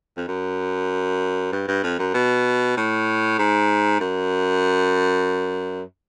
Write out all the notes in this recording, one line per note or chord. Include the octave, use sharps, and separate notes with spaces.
F2
F#2
G2
G2
F2
F#2
B2
A2
G#2
F#2